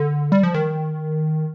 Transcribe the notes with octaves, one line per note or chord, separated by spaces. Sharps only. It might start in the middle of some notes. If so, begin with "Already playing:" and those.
Already playing: D3
G3
F3
D#3